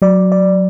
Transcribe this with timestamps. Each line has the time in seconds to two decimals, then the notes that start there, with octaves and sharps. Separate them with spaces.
0.02 F#3 D5
0.32 D5